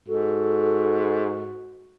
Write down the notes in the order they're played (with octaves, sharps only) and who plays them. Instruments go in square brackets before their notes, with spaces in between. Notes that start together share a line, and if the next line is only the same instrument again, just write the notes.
[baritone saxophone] G#2 [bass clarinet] F#4 [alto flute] A4